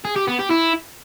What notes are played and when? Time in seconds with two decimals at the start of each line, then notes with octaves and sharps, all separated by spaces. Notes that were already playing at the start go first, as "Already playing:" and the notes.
0.05 G#4
0.16 G4
0.28 B3
0.39 G4
0.51 E4